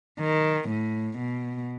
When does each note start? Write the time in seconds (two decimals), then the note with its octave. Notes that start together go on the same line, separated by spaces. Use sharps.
0.20 D#3
0.69 A2
1.19 B2